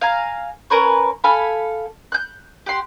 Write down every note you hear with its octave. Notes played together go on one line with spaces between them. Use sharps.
F5 G#5 A#5
C#4 A#4 B4 C#5
A4 F5 G#5 B5
F#6 G6
G4 F#5 C6